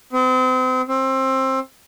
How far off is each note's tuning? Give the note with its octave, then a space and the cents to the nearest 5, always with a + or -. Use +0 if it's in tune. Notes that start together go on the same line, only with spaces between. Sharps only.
C4 -35
C4 +20